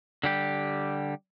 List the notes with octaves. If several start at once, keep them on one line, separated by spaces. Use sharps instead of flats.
D3 G3 G4